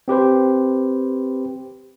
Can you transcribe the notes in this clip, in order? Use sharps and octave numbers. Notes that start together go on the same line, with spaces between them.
C4 G4 B4 C5